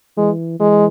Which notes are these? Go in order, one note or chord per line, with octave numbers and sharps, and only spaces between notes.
E3 G#3
E3 G#3